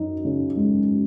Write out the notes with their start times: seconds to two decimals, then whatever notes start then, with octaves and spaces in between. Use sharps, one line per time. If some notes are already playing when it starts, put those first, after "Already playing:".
Already playing: F#2 D#4
0.25 C#3
0.56 G#3